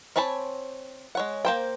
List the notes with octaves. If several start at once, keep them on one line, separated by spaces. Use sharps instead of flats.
C4 C#5 G#5 A5 B5
G#3 C#5 F#5
A#3 C5 G5